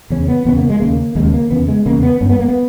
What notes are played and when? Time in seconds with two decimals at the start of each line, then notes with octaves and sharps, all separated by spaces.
0.10 E2 C#3 C#4
0.28 B3
0.45 E2 C#3 B3
0.57 A#3
0.69 G#3
0.80 D#2 C#3 A#3
1.15 D#2 C#3 G#3
1.34 A#3
1.51 E2 C#3 B3
1.68 G#3
1.86 E2 C#3 A#3
2.03 B3
2.21 G2 C#4
2.29 B3
2.39 A#3
2.48 B3